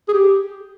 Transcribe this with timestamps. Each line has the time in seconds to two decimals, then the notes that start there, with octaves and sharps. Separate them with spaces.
0.08 G#4
0.13 G4